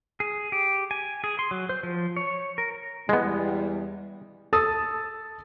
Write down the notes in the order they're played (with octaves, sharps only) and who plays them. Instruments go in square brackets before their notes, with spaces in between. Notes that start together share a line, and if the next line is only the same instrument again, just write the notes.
[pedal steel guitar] G#4
G4
G#5
G#4
C6
F#3
C5
F3
C#5
A#4
[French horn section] E2 E3 G3 [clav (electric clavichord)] G#3 B3
[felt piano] A4 A5 D#6 E6 A6